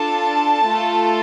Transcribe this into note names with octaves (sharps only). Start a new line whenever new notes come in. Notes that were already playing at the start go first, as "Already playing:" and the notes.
Already playing: D4 F4 A4 A5
A3 F4 A4